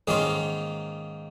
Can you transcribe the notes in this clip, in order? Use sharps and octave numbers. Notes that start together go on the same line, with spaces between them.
G#2 D#3 A#3 C#4 F4 G#4